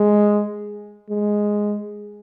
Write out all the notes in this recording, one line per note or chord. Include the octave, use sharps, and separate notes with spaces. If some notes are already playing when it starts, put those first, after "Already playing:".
Already playing: G#3
G#3